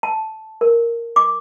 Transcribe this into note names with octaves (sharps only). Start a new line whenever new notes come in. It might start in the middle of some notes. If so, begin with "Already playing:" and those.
A5
A#4
D6